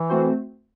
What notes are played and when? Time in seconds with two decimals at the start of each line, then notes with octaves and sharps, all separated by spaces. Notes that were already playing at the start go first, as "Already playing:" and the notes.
Already playing: E3
0.09 A3 C4 F#4 C5